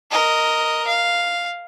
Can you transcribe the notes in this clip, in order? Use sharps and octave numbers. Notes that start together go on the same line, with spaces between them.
A#4 D#5
F5